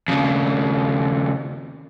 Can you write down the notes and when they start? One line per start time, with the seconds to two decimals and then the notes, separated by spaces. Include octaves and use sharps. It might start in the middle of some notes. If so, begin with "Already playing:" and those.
0.08 D#2 C#3